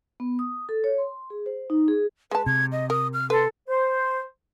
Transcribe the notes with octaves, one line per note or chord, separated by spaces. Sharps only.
B3
D#6
A4
C#5
C6
G#4
C5
D#4
G#4
G#3 B4 A5
C3 G#6
D#5
A#4 D#6
F6
A4 B4 C6
C5